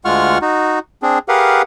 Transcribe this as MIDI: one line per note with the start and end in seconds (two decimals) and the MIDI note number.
0.05 0.38 38
0.05 0.38 56
0.05 0.38 65
0.05 0.38 78
0.05 0.38 85
0.05 0.38 89
0.42 0.79 63
0.42 0.79 66
1.02 1.19 60
1.02 1.19 62
1.02 1.19 68
1.28 1.62 67
1.28 1.62 68
1.28 1.62 70
1.28 1.62 71
1.28 1.62 77
1.28 1.62 78